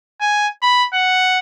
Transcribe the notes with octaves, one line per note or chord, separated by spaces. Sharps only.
G#5
B5
F#5